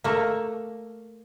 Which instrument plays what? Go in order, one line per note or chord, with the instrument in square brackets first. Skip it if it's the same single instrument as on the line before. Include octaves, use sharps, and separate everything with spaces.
[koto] A3 A#3